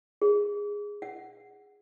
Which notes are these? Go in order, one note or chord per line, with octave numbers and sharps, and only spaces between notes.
G#4
F#5